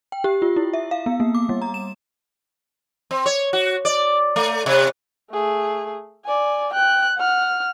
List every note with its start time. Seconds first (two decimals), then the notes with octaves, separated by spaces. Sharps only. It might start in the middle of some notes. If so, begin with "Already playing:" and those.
0.12 G5
0.24 G4
0.42 F4
0.56 E4
0.73 E5
0.91 F5
1.06 B3
1.20 A#3
1.35 D6
1.49 G3
1.62 A#5
1.74 E7
3.11 C4
3.26 C#5
3.53 F#4
3.85 D5
4.36 A3
4.66 C3
5.31 A3 G#4
6.26 D5 G#5
6.74 G5 F#6
7.18 F#5 F6